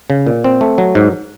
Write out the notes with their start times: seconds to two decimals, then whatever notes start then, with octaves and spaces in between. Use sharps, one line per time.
0.10 C#3
0.27 A#2
0.44 C4
0.61 A3
0.78 F#3
0.95 G#2